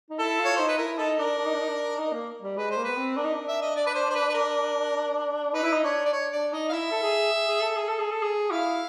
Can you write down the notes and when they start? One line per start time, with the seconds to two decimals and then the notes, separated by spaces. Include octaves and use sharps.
0.10 D#4
0.19 E4 A4
0.39 F4
0.45 C#5
0.56 D#4 C5
0.68 B4
0.78 E4 A#4
0.98 D#4 A4
1.18 D4 A#4
1.38 D4
1.46 D#4
1.54 D4
1.60 D#4
1.68 D4
1.98 D#4
2.12 A#3
2.42 G3
2.57 G#3 B4
2.71 C5
2.77 A#3
2.84 B4
2.90 B3
2.96 C4
3.17 D4 A#4
3.24 D#4
3.34 D4
3.48 E5
3.62 D#5
3.76 D5
3.87 B4
3.95 C5
4.11 C5
4.15 B4
4.29 B4
4.35 A#4
5.53 D#4 B4
5.63 E4
5.73 D#4
5.83 D4 C#5
6.06 D5
6.13 C#5
6.33 D4 D5
6.53 D#4 D#5
6.69 F5
6.72 E4 E5
6.91 A4
7.02 G#4
7.33 G#4
7.48 G#4
7.61 A4
7.76 G#4
7.88 A4
7.99 G#4
8.12 A4
8.22 G#4
8.50 E4 F5